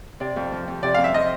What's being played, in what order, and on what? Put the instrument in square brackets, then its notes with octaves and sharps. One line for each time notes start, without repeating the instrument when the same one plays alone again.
[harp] C3 [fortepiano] D5
[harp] F2
F3
F2
[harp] C3 [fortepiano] D5
[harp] F2 [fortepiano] F5
[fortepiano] E5
[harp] F3 [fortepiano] D#5